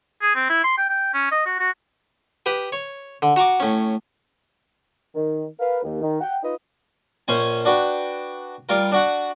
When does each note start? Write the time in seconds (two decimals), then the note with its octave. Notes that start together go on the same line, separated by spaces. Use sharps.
0.22 G#4
0.35 C4
0.50 E4
0.64 C6
0.78 G5
0.90 G5
1.14 C#4
1.31 D#5
1.45 F#4
1.59 F#4
2.46 G4 B4 G5 D#6
2.72 C#5
3.22 D3
3.36 F#4 A#5 C#6 D6
3.60 A2 C#4
5.15 D#3
5.60 A#4 B4 F5
5.83 D#2
6.02 D#3
6.21 F#5 G5
6.43 D#4 F4 B4 D#5
7.28 A#1 C#4 C5 G#5
7.65 D4 F#4 B4 G5
8.69 G3 F4 A#4
8.92 D4 F#4 F#5